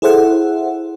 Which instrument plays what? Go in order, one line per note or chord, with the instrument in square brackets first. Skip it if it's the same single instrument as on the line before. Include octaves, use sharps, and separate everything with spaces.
[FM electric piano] E4 G#4 A4 C5 E5 F#5